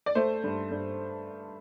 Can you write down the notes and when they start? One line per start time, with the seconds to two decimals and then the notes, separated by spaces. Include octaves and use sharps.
0.06 D5
0.15 A3 C5
0.44 G2
0.71 G2